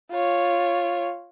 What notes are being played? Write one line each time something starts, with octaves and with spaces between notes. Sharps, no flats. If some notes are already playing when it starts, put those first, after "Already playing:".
F4 C#5